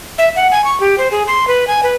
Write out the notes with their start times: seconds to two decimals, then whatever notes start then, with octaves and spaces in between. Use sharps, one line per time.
0.18 E5
0.36 F#5
0.51 G#5
0.64 C#6
0.80 G4
0.98 C5
1.11 G#4
1.28 C6
1.47 B4
1.68 G#5
1.83 B4